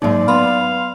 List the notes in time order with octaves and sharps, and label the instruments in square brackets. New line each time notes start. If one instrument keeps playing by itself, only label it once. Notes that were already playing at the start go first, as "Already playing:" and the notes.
[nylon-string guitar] G#2 D#3 [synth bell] F#3 A#3 D#4 [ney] D5
[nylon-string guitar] B3 [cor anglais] F5 [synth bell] B5 C6